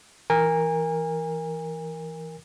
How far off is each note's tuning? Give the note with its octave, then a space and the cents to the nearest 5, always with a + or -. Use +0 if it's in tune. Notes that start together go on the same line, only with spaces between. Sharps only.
E3 +0 A#4 +0 G#5 -30